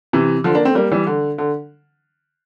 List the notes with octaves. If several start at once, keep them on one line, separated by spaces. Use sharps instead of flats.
C3 E3
D3 F3
A#3 D4
A3 C4
G3 A#3
E3 G3
D3
D3